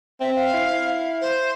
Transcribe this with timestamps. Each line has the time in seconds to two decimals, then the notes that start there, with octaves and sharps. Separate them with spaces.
0.21 C4 E5
0.36 F5
0.54 E4
1.21 C5